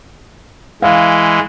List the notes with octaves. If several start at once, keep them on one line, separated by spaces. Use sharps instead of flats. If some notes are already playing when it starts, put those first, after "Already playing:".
E3 G#3 F5